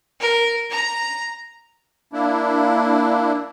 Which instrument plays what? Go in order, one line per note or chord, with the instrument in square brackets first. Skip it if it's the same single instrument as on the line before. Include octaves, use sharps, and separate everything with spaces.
[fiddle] A#4
A#5
[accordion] A#3 D4 E4